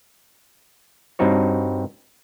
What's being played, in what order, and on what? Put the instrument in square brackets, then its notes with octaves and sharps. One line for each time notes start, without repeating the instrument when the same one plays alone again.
[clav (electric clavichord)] G2 C4 D#4 F#4 C#5